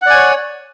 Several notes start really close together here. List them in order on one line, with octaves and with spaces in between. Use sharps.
F#5 D5 G#5 C#5